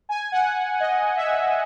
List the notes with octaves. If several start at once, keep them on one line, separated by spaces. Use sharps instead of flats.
G#5
F#5
D#5
E5